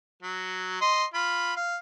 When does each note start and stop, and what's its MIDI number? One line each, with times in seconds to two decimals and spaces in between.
0.23 0.78 54
0.81 1.04 75
0.81 1.04 84
1.14 1.53 65
1.14 1.53 83
1.56 1.76 77